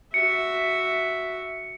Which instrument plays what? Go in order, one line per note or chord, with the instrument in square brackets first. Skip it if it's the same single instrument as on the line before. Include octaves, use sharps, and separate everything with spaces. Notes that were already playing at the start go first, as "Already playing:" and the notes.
[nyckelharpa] F#4 E5 [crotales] C#7